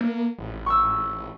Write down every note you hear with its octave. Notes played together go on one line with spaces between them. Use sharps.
A#3
A1
C#6 E6